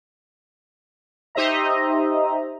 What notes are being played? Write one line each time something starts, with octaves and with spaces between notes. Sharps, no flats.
D#4 G4 C5 D#5 E5 A#5